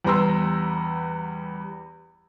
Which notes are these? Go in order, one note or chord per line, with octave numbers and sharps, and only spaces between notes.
E2 G3 B3 A#5 C6 E6